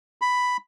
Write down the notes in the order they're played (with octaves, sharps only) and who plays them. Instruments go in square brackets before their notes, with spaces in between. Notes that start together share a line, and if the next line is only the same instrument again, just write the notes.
[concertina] B5